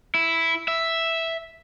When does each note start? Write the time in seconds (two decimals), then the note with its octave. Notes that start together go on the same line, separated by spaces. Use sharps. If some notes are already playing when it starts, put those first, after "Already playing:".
0.15 E4
0.68 E5